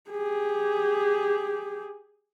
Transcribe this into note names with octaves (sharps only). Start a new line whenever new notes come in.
G4 G#4